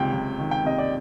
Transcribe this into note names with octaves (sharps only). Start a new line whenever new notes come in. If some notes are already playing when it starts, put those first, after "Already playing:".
Already playing: C#2 C3 D#3 G5
C#2
D#3
G5
C3 D#5
D5